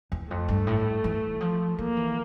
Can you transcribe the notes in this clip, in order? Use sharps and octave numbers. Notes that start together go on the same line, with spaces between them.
E2
F2 A3
G2
A2
E3
F3
F3 A#3
E3